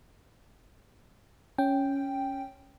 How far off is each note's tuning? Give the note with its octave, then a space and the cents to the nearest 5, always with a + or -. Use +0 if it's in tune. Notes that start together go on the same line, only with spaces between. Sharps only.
C#4 +0 G5 +0